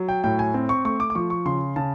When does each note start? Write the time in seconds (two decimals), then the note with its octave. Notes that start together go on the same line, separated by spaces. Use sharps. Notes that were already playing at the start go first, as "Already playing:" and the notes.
Already playing: F#3
0.09 G5
0.24 A2 G5
0.39 G#5
0.54 C4
0.69 C#6
0.85 A3 C#6
1.00 D6
1.10 D6
1.15 F3 C#6
1.30 C#6
1.45 C#3 C6
1.76 C#3 A5